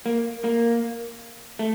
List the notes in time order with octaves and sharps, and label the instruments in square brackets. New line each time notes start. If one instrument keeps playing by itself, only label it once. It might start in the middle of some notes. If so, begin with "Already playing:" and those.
[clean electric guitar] A#3
A#3
A3